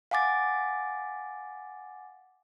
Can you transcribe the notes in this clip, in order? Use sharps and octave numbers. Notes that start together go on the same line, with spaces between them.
F5 F#5 G#5 D6 A6